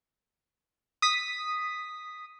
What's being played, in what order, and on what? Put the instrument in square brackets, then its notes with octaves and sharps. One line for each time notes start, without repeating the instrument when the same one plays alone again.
[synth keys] D#6 B6